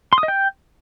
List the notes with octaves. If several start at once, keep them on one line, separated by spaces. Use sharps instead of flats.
C6
D#6
D#5
G5